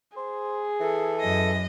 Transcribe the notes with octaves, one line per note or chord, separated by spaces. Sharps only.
G#4 C5
E3 A4
F#2 D#5